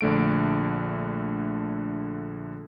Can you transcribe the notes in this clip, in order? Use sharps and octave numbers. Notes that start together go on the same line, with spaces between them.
A#1 D3 A3 D7